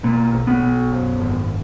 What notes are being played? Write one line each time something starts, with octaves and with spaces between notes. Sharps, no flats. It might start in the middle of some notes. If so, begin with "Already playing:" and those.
B2 A#3
B1
B3
B1
F#2
G#1